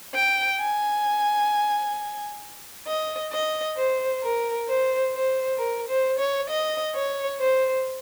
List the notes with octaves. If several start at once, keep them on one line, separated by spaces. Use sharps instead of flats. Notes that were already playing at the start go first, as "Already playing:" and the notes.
G5
G#5
D#5
D#5
C5
A#4
C5
C5
A#4
C5
C#5
D#5
C#5
C5